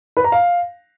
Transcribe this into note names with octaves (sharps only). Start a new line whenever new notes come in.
B4
A#5
F5